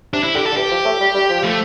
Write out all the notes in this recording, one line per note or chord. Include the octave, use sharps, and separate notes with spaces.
C3 D4
E4
D3 G4
A4
D3
E3 G4
F3
A3
G3
G3
F3
A3